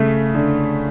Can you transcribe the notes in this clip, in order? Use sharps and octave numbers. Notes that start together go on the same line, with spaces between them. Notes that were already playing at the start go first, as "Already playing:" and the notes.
Already playing: C#3 A3
D3